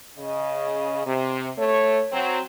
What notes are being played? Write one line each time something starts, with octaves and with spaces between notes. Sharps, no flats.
C#3 D#5
C3
A3 C#5
F#3 C4